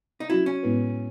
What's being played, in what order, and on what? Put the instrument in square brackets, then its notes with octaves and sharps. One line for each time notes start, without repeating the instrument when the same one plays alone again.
[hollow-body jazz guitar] D#4
[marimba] F#3 C#4 F#4 [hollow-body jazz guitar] E4
[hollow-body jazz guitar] C#4
[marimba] A2 G#3 B3 E4 B4